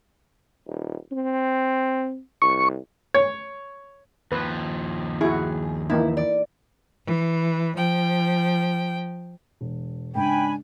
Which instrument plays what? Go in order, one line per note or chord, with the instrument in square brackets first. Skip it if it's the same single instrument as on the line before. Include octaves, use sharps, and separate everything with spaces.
[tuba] D#1
C4
[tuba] C2 [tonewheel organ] C#6
[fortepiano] C#5
[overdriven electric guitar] D#2 F3 [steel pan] B4
[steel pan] E4 F#4 [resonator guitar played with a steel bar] G#4
[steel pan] E3 A#3 D#4 [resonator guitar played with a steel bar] E4
[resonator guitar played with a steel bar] D5
[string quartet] E3
F3 G5
[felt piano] E1
[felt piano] G#2 C#3 [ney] D4 [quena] G5 [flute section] G#5 B5